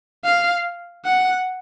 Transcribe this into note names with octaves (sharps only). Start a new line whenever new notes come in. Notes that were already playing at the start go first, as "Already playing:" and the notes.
F5
F#5